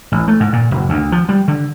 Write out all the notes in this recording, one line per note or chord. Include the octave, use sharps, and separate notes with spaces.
A1
A3
G#2
A#2
F#1
D2
F3
G3
D3